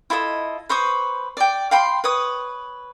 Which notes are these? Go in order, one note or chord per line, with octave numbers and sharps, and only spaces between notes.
E4 F4 A4 D#5
B4 C5 C#6 D#6
D5 G5
F5 G5 B5 C6
B4 C#5 D#6